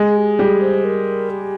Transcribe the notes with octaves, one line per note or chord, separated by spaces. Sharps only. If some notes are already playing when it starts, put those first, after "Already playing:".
Already playing: G#3
G#4
G4
G3 G#4
C5
A#4
G4